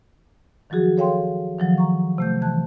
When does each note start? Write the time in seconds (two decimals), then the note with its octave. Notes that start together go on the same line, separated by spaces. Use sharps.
0.70 D#3 F3 F#3 F#4 G#4
0.97 A4 C#5 F5 G5 C6
1.58 D#3 F3 F#3
1.78 A#5 C#6
2.18 C3 A3 G6
2.42 E3 A5 F#6